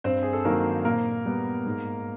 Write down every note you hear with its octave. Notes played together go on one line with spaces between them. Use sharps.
G2 C4 C5
G#4
A4
D#3 F#3 A#3 A#4
A#2 A#3 A#4
G3 B3
G#2